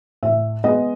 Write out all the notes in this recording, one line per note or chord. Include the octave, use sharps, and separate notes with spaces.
A2 E5
G#3 B3 D#5